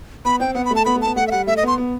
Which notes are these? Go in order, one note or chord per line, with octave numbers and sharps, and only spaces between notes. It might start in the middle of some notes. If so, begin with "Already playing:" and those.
B3 B5
C4 G5
B3 F#5
B5
A3 A5
B3 B5
A3
B3 A5
A3 F#5
E5
G3 F#5
A3 E5
D#5
B3 C6
B3